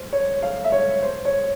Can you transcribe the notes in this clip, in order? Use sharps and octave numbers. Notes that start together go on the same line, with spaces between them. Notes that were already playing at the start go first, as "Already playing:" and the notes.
Already playing: C5
C#5
F5
E5
C#5
C5
C#5